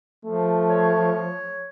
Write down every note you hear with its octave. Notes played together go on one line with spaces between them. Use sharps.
F3 A3
C#5